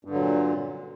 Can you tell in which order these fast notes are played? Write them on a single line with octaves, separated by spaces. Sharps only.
G2 D3 F#3 A#2